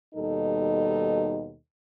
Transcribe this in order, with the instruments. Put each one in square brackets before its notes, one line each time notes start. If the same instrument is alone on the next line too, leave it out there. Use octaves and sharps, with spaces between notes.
[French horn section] D#2 B2 G3 D#4 A4